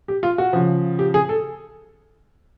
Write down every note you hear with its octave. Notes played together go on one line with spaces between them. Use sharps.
G4
F4
F#4
C#3 F3
G4
G#4
A4